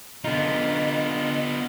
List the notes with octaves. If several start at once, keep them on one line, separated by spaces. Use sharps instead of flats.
D3 B3 D#4 F4